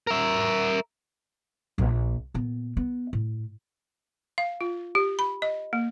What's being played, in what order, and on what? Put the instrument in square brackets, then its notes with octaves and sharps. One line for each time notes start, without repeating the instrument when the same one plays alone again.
[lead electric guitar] A#4 E5
[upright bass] A#1 A#2
A#2 B3
B3
A2
[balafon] F5
F4
G4
B5
D#5
A#3